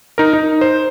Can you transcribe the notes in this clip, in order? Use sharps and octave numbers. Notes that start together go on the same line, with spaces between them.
D#4 A#4
D#4
C5